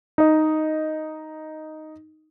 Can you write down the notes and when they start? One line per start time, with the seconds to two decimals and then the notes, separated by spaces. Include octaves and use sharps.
0.18 D#4 D#5